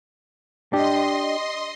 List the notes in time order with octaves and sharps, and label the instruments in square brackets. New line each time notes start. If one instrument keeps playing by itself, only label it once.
[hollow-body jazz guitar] D4 G4 [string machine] D#5 C6